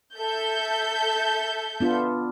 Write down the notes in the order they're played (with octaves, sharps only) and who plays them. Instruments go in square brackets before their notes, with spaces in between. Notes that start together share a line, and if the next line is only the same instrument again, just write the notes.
[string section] A4 E5 G6
[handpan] B3 D4 F4